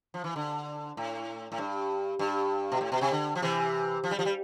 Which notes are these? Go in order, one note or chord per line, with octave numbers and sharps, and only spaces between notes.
F3
E3
D3
A2
A2
G2
G2
B2
A2
B2
C3
D3
F3
C3 E3
F3
G3
F3
G3